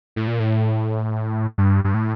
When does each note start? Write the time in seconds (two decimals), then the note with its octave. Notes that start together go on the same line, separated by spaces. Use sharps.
0.16 A2
0.27 A#2
0.40 A2
1.58 G2
1.84 G2
1.94 A2